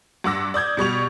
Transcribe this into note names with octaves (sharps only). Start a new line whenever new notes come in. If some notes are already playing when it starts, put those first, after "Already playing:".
G2 F#5 D6 E6 A#6
D5 D#6 G6 G#6
B2 G3 C#6 F7